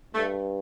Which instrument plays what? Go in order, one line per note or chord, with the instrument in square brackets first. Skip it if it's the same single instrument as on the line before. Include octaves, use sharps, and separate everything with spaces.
[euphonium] G2 [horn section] A3